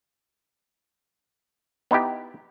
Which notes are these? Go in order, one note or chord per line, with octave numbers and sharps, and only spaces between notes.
B3 D#4 E4 G4